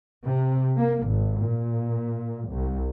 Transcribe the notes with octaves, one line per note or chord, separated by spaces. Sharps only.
C3
A#3
G#1
A#2
C2